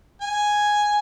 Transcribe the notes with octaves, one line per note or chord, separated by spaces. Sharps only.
G#5